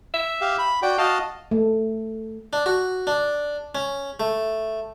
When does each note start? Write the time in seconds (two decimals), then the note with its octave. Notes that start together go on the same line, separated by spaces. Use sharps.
0.14 E5
0.41 G4 F5
0.58 B5
0.82 F#4 D5 G5
0.98 F#4 D#5 F5 A5
1.51 A3
2.53 D4
2.66 F#4
3.07 D4
3.75 C#4
4.20 A3